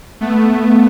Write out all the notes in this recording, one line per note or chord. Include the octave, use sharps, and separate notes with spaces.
A3 B3